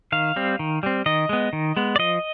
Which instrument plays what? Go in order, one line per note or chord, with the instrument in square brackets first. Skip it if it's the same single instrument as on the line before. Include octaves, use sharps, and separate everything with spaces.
[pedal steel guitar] D#3 F5
G3 C4
D#3
G3 C4
D#3 D#5
G#3 B3
D#3
G#3 B3
D5
F3 D#5